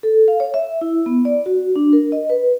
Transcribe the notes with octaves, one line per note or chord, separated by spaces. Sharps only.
A4
F5
C#5
E5
E4
B3
D5
F#4
D4
A#4
D#5
B4